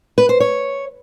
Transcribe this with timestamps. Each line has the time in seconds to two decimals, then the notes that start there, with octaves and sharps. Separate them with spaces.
0.18 B4
0.29 C5
0.40 C#5